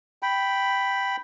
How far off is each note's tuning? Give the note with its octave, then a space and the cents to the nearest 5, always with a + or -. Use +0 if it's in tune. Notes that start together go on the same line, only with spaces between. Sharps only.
G5 -5 B5 +0